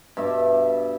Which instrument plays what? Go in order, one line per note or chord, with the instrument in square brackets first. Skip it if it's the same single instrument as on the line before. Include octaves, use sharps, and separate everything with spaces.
[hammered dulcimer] G2 B2 E5 D6